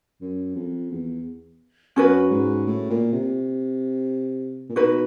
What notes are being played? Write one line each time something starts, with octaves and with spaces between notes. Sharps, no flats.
F#2
F2
E2
F#2 C#4 F#4 B4
G#2
A2
A#2
C3
A#2
B2 D#4 F#4 B4